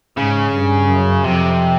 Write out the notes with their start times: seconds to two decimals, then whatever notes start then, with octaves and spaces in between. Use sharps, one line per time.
0.17 G#2 C#3
0.53 G2
0.88 F#2
1.24 F2 C3